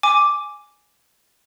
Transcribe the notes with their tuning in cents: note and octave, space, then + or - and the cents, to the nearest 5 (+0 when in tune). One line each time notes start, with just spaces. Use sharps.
G#5 +0 D6 +0